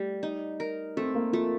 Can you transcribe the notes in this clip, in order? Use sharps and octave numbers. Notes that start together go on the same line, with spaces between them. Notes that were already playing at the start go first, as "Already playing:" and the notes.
Already playing: G3 A3
D#4
A#4
A3 C4
A#3
F3 A3